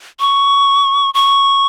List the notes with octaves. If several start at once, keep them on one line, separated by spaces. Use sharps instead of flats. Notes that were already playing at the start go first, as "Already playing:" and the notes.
C#6
C#6